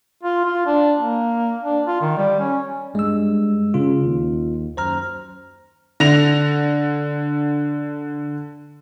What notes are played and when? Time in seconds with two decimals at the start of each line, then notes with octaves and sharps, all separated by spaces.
0.23 F4
0.45 F4
0.66 D4
0.98 A#3
1.63 D4
1.86 F4
2.01 D#3
2.17 G3
2.40 C#4
2.95 G2 G#3 E6
3.74 C#3 F4
4.05 D#2
4.77 F#2 C5 A#5 F6
6.00 D3 A#6 F7